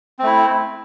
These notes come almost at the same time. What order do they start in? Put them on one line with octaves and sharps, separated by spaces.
C4 A3 E4